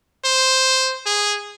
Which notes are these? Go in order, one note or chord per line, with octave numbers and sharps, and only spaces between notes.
C5
G#4